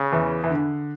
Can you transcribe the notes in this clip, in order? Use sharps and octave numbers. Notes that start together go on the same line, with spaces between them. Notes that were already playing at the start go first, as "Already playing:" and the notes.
Already playing: C#3
E2 E3
E3
D3